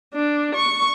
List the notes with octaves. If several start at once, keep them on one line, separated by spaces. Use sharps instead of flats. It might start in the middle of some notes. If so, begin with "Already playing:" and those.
D4
C#6